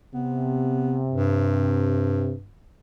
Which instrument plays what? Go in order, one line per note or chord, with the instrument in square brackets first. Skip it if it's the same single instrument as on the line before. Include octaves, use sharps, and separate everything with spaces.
[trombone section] C3 [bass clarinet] B3
[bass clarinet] G2